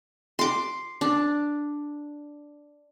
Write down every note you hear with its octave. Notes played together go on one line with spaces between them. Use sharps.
C6 D6
D4